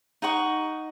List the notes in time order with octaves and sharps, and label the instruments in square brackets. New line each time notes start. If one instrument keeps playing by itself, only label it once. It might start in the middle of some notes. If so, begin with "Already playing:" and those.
[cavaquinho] D#4 D#5 F#5 C#6